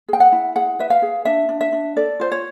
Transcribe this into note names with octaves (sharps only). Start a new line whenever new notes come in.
G#4 G5
F#5
E4
G#4 F#5
B4 E5
F5
G#4
D4 E5
D4
E5
D4
A4 D5
F4 C5
C#5